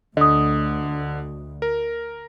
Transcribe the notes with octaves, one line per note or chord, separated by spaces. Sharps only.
D2 D3 D#5 D#6
A#4